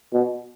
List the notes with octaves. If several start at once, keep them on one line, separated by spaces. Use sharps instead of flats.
B2